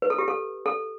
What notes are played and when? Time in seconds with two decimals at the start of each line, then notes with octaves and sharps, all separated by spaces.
0.02 B4
0.10 A4
0.18 G4
0.28 A4
0.66 A4